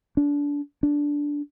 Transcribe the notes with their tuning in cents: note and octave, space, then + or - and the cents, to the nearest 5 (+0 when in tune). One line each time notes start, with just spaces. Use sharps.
D4 -25
D4 -10